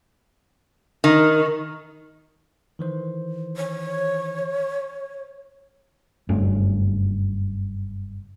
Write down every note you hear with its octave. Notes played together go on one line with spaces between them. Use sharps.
D#3
D#3 E3 C5
C#5
F#1 G2 A3 C#4